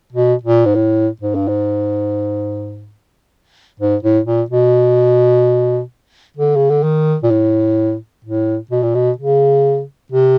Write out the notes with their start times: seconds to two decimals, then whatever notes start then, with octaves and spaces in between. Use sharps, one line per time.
0.12 B2
0.43 A#2
0.66 G#2
0.75 A2
1.21 G#2
1.35 G2
1.48 G#2
3.80 G#2
4.03 A2
4.26 A#2
4.50 B2
6.37 D3
6.56 C#3
6.70 D3
6.83 D#3
7.23 A#2
7.31 A2
8.25 A2
8.71 B2
8.83 A#2
8.95 B2
9.18 C#3
10.12 C3